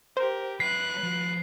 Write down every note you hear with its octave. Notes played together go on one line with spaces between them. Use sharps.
G4 A#4 C5
F#3 B4 E5 F#6 B6 C7
F3 F#4